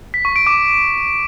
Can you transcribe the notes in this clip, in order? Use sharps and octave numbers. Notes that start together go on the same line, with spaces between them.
B6
C#6
D7
D6